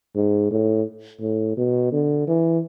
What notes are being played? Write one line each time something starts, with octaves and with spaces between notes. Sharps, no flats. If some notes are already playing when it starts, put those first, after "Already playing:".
G#2
A2
A2
B2
D3
E3